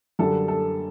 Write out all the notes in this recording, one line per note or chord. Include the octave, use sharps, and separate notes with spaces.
F#2 D3 G3 A4
A4